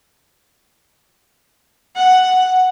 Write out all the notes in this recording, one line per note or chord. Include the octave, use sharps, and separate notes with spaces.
F#5